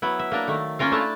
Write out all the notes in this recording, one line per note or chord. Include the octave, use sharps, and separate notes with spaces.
F#3 B3 E4
E5
A#3 D4 A#5
D#3 A3
A#3 C#4 F4 A#4 F5
A3 D4 E4 A5